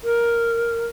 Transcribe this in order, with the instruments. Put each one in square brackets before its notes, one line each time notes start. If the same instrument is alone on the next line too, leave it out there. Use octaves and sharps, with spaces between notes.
[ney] A#4